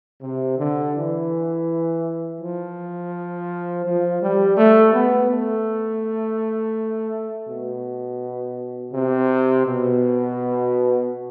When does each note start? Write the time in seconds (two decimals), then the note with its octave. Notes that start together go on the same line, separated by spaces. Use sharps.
0.22 C3
0.58 D3
0.95 E3
2.40 F3
3.85 F3
4.21 G3
4.57 A3
4.93 B3
5.30 A3
7.48 B2
8.93 C3
9.66 B2